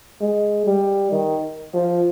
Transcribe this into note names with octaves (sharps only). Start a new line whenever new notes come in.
G#3
G3
D#3
F3